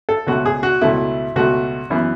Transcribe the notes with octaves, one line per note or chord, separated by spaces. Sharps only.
A4
C#2 B2 A3 F#4
G#4
F#4
C#2 B2 A3 E4
C#2 B2 A3 F#4
F#2 E3 B3